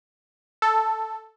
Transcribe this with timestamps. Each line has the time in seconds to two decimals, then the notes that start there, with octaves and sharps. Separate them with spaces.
0.62 A4